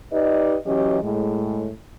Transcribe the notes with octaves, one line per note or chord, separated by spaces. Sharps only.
D#4 G4 B4 D5 D#5
E3 F#3 C#4 G4 D#5
A2 G#3